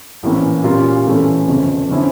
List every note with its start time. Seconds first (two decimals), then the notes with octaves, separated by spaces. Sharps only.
0.23 A#1 A2 E3 A#3 C#4
0.64 A#2 G3 C#4 F4 A#4
1.06 A2 E3 A3 C#4
1.47 G1 F2 C#3
1.89 D3 F3 C#4 E4